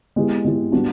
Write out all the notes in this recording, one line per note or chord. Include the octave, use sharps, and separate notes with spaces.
G#3 B3 E4 G4
G#3 B3 E4 G4
G3 B3 D4 F#4